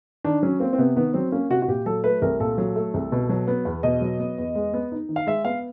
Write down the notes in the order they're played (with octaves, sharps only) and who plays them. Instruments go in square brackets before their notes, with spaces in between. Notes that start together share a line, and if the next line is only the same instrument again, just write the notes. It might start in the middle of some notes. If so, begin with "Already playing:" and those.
[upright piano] D#3 [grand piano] D4
[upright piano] F#3 [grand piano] C#4
[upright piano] A#3 [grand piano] C4
[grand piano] C4
[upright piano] C3 [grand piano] B3
[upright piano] D#3 [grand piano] B3
[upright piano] F#3 [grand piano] C4
[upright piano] A#3 [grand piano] C#4
[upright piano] C3 [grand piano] F#4
[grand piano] F#4
[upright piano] A#2 [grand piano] G4
[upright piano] F#3 [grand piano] A4
[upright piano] A3 [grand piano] B4
[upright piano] C2 [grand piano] A#4
[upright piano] A#2 [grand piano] A4
[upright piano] F#3
A3
C2
B2
F#3
B3
E2
[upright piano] B2 [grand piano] D#5
[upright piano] F#3
B3
E2
G#3
B3
D#4
D#3
[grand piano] F5
[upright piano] G#3 [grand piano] E5
[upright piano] B3 [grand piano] F5